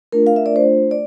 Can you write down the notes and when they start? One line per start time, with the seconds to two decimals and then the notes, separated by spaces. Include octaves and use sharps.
0.12 A3 D4 F4 A#4
0.27 F5
0.36 E5
0.46 D5
0.56 C5
0.91 D5